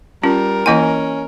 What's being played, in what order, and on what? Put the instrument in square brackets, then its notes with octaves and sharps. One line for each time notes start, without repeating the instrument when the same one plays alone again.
[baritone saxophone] G3 [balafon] C#4 F4 [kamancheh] A#4
[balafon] E3 A#3 E4 [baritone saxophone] C#4 [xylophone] D#5 G#5